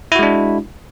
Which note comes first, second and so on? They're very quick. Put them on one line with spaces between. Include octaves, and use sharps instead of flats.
E4 F#4 G#3 D4